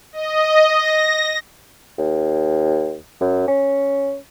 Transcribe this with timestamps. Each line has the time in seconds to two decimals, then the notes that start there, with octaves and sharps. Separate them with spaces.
0.13 D#5
0.69 A#6
1.98 D#2
3.21 F#2
3.48 C#4